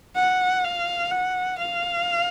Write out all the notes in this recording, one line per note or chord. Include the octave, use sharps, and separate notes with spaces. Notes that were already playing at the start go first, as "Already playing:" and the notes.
F#5
F5
F#5
F5